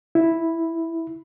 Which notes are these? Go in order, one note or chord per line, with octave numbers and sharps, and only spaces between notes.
E4